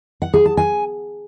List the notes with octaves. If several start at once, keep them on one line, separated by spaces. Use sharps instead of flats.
F#5
G#4
A5
G#5